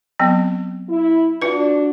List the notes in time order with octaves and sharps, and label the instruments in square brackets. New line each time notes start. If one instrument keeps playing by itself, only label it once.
[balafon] F#3 B3 C4
[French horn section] E4
[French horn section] D4 F#4 [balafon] F4 B4